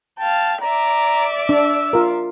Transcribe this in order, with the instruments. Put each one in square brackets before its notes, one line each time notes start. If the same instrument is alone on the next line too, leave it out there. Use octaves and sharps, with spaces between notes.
[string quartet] F5 G5 [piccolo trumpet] A5
[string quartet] D5 E5 D6 [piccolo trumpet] A#5
[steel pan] D4 [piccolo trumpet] E6
[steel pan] F4 A#4